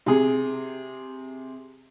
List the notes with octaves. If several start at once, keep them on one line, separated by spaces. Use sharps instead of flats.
C3 G#4